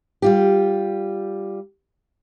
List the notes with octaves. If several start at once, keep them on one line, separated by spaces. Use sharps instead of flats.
G3 F4 G4